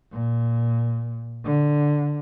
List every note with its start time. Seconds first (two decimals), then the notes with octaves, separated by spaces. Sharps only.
0.12 A#2
1.45 D3